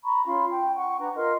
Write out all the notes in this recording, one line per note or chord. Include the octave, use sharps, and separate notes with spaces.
A#5 B5 C#6
C#4 F4 B5 C6
G5
F#5 C#6
D4 B4 A#5
F4 A#4 D#5 C6